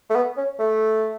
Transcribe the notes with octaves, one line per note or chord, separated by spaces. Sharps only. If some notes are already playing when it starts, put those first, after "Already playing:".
A3
B3
C#4
A3